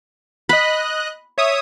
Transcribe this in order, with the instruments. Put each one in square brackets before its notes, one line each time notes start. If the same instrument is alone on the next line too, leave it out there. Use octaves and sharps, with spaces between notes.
[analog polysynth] D#5 F#6 [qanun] B5
[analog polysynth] C#5 E5 D#6